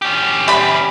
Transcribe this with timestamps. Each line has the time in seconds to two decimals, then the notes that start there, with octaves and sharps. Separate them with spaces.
0.02 C#4 G4
0.48 G3 B5